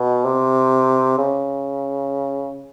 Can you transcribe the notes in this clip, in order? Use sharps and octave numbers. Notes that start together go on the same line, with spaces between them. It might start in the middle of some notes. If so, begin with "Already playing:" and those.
Already playing: B2
C3
C#3